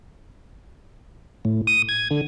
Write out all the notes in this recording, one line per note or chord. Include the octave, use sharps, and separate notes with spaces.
A2
D#6
G#6
D3